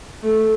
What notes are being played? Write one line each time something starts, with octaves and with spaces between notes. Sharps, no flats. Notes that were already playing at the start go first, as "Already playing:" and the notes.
A3